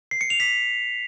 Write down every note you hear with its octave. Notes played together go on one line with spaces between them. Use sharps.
C7
C#7
F7
B6